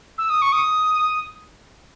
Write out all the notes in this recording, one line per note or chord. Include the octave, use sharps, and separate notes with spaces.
E6
D#6
C#6
D#6